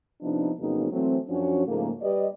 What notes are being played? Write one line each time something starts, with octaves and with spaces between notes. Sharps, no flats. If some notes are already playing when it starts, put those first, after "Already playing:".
C3 F3 B3 D4 D#4
F2 C#3 F#3 A#3 B3 D#4
E3 F#3 A3 C4
F#2 F3 C#4 D4 F#4 C#5
G#2 C#3 F3 A3 A#3
G3 G4 B4 D5 D#5